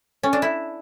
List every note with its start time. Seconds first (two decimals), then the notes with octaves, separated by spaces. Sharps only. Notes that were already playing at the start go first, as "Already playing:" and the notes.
0.23 C#4
0.33 D4
0.42 E4